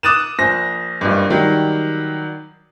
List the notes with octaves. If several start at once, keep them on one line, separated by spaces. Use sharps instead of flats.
D6 D#6 F#6 A6 D#7 E7
A#1 C5 A#6
F#1 G2
D#3 F#3 G3